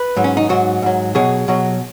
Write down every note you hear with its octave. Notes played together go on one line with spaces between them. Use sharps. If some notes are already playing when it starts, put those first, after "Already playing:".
Already playing: B4
G#2 F#3
C#4
D#4
G#2 F#3 F#4
G#2 F#3
B2 F#3 G#4
B2 F#3